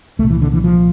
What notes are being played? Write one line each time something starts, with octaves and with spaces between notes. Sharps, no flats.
C2 A#2 A3
E3
D3
E3
F3